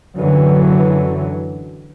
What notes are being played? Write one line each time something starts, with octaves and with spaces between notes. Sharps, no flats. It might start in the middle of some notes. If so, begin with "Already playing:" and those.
F#2 D3 E3 F#3